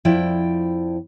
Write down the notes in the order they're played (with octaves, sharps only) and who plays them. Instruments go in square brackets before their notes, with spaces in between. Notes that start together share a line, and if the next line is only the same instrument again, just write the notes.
[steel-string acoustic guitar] F2 F3 E4 D5 G5